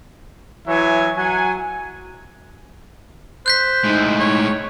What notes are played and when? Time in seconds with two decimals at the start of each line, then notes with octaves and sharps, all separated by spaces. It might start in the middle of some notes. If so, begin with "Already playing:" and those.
0.68 E3 F#3 C#5 E5 G#5
1.17 F#3 F#5 G#5
3.46 C5 F#6 G6 B6
3.84 A2 G#3 D#4
4.20 C#5